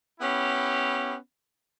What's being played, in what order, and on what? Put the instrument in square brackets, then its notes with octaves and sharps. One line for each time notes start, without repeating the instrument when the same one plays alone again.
[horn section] B3 C#4 E4 G4